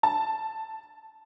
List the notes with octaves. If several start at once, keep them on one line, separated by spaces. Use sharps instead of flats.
A5